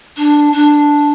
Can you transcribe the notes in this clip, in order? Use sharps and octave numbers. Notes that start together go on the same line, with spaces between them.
D4
D4